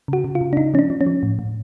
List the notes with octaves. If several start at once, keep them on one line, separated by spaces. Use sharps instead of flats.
C#3 F#4
C#3
F4
C#3
D4
C#3 D#4
F3 C#4
D4
F3
C#4
F3
A2
A2